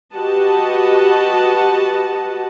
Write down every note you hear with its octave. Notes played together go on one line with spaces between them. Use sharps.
F#4 G4 B4 D#5 F#5 A5